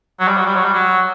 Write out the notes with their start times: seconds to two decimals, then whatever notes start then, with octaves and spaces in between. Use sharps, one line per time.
0.20 F#3
0.28 G3
0.37 F#3
0.46 G3
0.56 F#3
0.65 G3
0.74 F#3